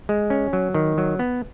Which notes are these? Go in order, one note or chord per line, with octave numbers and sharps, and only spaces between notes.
G#3
C#4
F#3
D#3
F#3
B3